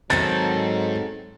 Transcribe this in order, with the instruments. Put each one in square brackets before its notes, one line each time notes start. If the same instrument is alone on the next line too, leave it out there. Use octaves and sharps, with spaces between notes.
[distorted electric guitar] G#2 G#5 [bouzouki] D#3 C4 A4 [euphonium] F#3 [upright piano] A6